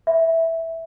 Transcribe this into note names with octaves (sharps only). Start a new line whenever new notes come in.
E5